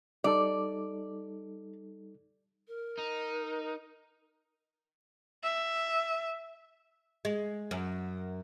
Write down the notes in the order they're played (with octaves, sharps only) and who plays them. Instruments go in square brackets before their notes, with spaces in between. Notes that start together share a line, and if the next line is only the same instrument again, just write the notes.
[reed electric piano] G3 D#4 A4 [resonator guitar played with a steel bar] D5
[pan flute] A#4
[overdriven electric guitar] D#4
[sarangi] E5
[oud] G#3
F#2